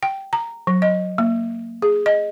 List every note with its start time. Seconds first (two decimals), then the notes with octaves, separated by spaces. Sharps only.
0.03 G5
0.33 A#5
0.67 F#3
0.82 D#5
1.18 A#3
1.82 G#4
2.06 D#5